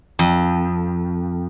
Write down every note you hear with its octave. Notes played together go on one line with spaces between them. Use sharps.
F2